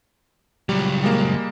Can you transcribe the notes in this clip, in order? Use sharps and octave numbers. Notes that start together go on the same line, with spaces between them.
C#2 F#3 G3
G3 G#3 A#3